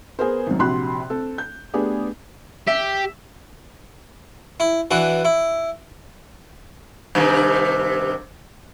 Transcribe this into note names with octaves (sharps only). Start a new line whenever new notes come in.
B3 G#4 A#4 C5
G#1 F#2
A#1 C3 F#4 B5 C6 F#6
C4 A4
G6
A3 B3 D4 G4 G#4 B4
G4 E5
E4
E3 D4 F#4
E4
G2 C3 D#3